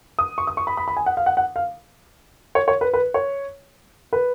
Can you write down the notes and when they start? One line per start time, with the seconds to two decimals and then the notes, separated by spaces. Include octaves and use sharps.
0.19 D#6
0.38 C#6
0.47 D#6
0.57 C#6
0.67 B5
0.77 B5
0.88 B5
0.97 G#5
1.06 F#5
1.17 F5
1.26 F#5
1.37 F#5
1.56 F5
2.55 C#5
2.68 C#5
2.81 B4
2.94 B4
3.14 C#5
4.13 B4